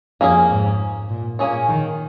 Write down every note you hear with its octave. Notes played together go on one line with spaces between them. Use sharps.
F2 A#3 C#4 G#4
G#2
A#2
A#2 A#3 C#4 G#4 C#5
D#3